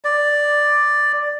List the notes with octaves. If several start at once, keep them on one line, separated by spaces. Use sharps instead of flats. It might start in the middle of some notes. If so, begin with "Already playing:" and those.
D5